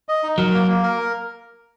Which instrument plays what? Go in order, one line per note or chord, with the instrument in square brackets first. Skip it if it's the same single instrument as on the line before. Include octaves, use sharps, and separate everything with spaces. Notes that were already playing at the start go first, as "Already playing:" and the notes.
[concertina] D#5
D#4
[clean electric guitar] F#3 [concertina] A#4
[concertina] A#3
A#3
A#4